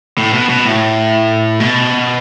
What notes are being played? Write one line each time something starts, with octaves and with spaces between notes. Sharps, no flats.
A2
B2
B2
A2
B2